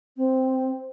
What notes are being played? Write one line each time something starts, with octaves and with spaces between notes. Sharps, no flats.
C4